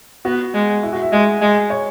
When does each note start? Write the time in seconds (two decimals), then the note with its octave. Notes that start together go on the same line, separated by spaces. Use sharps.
0.25 B3 F#4
0.54 G#3
0.83 E4
0.93 F#4
1.03 E5
1.12 G#3 D#5
1.41 G#3
1.70 C#5